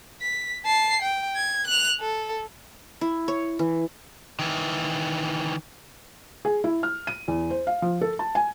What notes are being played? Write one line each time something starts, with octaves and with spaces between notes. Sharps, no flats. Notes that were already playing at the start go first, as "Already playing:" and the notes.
B6
A5 C7
G5
G#6
F#6 F7
A4
E4
C#5
E3
D#3 E3
G#4
E4
F6
D#7
E2
C5
F5
F3
A4
A5
G#5